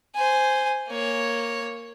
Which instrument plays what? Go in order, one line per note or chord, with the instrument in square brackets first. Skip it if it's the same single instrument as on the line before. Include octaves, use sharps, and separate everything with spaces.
[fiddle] C5 G#5
A#3 C#5